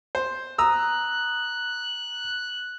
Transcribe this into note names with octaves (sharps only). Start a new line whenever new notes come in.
C5
A#5 D#6 E6 F#6